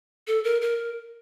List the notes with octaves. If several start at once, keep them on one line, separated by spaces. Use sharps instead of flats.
A4
A#4
A#4